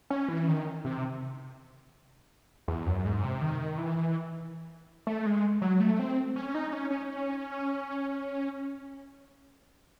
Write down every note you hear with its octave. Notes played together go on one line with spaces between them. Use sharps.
C#4
E3
D#3
C3
E2
F#2
G#2
C3
D#3
E3
A3
G#3
F#3
A3
C4
C#4
D#4
C#4
C#4